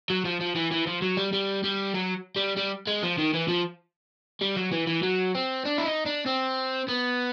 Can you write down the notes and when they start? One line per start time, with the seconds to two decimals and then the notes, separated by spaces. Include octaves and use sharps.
0.10 F#3
0.25 F3
0.41 F3
0.55 E3
0.71 E3
0.87 F3
1.02 F#3
1.17 G3
1.33 G3
1.64 G3
1.94 F#3
2.36 G3
2.57 G3
2.87 G#3
3.03 F3
3.18 D#3
3.34 E3
3.49 F3
4.42 G3
4.57 F#3
4.72 E3
4.87 E3
5.03 F#3
5.35 C4
5.65 D4
5.78 E4
5.85 D#4
6.06 D4
6.26 C4
6.88 B3